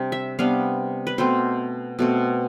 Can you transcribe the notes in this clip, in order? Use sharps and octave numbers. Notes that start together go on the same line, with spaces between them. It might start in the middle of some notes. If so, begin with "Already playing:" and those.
Already playing: C3 G3 D4
E5
C3 G3 B3 D4 F5
B4
B2 A3 C4 C5
B2 A3 C4